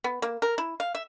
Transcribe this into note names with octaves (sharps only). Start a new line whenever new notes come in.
B3
A#3
A#4
E4
F5
E5